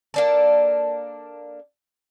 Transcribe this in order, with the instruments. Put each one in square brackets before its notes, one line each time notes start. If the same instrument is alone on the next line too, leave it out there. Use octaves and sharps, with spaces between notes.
[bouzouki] A#3 D4 A4